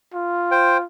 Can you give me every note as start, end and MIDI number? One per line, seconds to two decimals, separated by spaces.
0.14 0.85 65
0.51 0.77 72
0.51 0.77 79